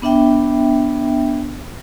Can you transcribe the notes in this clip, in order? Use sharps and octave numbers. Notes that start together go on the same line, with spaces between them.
B3 D4 E5 G5